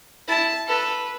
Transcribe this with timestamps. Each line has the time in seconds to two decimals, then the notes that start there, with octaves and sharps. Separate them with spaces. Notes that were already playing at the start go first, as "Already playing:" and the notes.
0.28 E4 A5
0.67 A4 B4